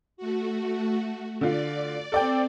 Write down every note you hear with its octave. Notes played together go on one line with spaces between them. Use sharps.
A3 F#4
D3 F4 D5
C4 A4 D5 G5